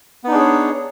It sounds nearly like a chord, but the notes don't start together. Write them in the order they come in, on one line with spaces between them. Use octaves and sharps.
B3 D#4 D4 G#4 C#5